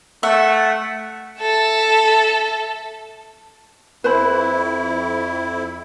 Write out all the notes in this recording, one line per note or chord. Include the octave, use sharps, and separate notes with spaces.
A3 E5 F#5
A4 E5
F2 E4 B4 C5 B5